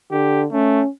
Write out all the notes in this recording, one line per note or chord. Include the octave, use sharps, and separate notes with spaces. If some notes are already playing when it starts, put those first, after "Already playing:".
D3 G4
A3 C#4